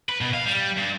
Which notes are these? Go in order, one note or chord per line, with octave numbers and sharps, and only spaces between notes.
B4
B2
F5
G3
G2